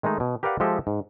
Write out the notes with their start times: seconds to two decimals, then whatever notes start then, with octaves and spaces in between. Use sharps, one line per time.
0.03 D#3 G#3 A3 D#4
0.20 B2
0.43 G4 A#4 B4 D5 F5 F#5
0.60 F3 G#3 G4 A4 D#5 E5
0.87 G#2